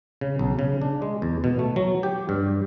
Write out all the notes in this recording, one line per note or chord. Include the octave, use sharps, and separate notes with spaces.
C#3
B1
C#3
D4
G#3
E2
B2
A3
F#3
G4
G2